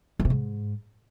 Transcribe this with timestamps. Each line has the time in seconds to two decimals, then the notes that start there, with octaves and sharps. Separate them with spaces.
0.20 E3
0.25 C3
0.30 G#2